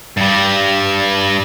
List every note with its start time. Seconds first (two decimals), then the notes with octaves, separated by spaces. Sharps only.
0.17 G2 G3